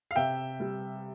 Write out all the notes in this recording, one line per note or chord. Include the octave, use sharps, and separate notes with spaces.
F5
C3 E5 G5
G3